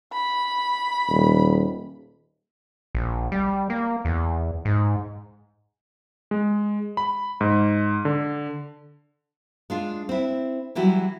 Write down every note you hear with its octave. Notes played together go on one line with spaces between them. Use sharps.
B5
D#1
A#1
G3
A#3
E2
G#2
G#3
B5
G#2
D3
G#3 D4 F4
C4 E4
E3 F#3 G3 E4 F#4